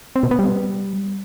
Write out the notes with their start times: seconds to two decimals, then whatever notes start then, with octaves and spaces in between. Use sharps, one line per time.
0.16 C4
0.23 B2
0.31 B3
0.39 G3